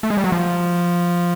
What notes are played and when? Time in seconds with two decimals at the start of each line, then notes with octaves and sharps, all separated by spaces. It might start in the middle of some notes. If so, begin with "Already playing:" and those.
0.03 A3
0.10 G#3
0.17 G3
0.24 F#3
0.32 F3